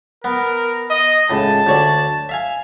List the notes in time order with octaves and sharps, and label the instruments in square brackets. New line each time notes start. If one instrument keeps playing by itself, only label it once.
[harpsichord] B3 [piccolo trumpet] A#4
[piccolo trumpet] D#5
[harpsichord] C#2 A2 [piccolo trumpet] A5
[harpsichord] D2 C#5 D5
E5 F5 G#5